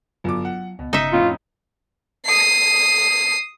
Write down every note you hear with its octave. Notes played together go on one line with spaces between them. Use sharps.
G1 F#3 F4 D6
F#5
C#2 B2
G1 C#3 D#4 E5 C#7
F2 A2 C#4 F4
D#6 C7